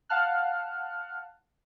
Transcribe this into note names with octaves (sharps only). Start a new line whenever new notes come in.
F5 F#5 A5 F6 F#6